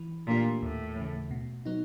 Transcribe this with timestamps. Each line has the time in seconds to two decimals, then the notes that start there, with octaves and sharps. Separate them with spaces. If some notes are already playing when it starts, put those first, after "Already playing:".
Already playing: E3
0.27 A#2 A3 D4 G4
0.62 D#2 A2
0.96 C#3 E3
1.31 B2
1.66 F#3 B3 D#4